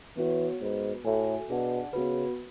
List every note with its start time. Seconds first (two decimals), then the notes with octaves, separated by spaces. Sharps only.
0.17 E3 B3 F#4 C#5
0.61 G#2 B3 F#4 B4
1.05 A2 F#4 A4 E5 G#5
1.49 B2 D4 G#4 D5 F#5 A5
1.93 C#3 B3 F#4 B4